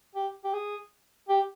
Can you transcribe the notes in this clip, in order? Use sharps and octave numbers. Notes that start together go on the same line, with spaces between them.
G4
G4
G#4
G4